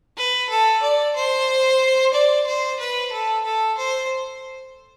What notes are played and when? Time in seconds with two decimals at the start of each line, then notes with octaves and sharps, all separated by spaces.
0.17 B4
0.50 A4
0.83 D5
1.16 C5
2.14 D5
2.47 C5
2.79 B4
3.12 A4
3.45 A4
3.78 C5